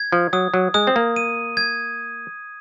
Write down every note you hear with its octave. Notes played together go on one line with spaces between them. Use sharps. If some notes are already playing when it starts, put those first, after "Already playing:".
Already playing: G#6
F3
F#3 D#6
F#3
G#3 D#6
C4
A#3
D#7
G#6